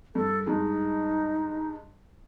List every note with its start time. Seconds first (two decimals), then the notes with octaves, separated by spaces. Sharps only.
0.15 G2 A4
0.46 G2 G#3 D#4